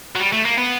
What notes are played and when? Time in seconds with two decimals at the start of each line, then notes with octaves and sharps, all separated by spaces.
0.16 F#3
0.20 G3
0.33 A3
0.45 A#3
0.58 B3